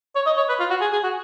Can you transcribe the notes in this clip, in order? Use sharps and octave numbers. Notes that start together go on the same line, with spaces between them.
C#5
D#5
C#5
B4
F4
F#4
G#4
G#4
F#4